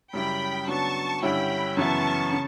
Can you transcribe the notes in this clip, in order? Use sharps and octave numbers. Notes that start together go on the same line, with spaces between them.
F#2 C#3 G3 C#4 E4 G5 B5
C#3 F#3 B3 D4 A5 C#6
G2 D3 G3 C#4 E4 G5 B5
F#2 C#3 E3 B3 E4 A5 C#6
C#3